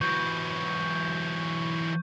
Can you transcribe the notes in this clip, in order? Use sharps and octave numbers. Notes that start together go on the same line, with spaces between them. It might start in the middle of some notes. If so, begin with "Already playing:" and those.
E3 F#3 C#6 G6